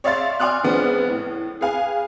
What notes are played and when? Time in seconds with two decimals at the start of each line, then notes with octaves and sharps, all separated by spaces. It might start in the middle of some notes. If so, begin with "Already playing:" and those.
0.04 C#5 D5 E5 F5 C6 A6
0.40 D5 G#5 C6 D6 F6 F#6
0.63 C#3 F3 G#3 B3 C4 D4
1.10 A2
1.61 G#4 B4 F5 G#5